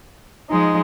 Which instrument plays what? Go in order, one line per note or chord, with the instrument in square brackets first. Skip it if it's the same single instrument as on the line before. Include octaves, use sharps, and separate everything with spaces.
[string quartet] F3 G#3 D#4